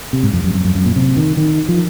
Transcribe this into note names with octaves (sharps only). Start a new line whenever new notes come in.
C3
G#2
F2
F#2
F#2
F#2
F#2
A#2
C3
D#3
D#3
F3